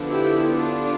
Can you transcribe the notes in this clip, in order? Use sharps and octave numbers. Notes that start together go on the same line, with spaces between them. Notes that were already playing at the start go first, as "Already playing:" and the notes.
Already playing: D3 F3 B3 D4
E4 G4
D4 F4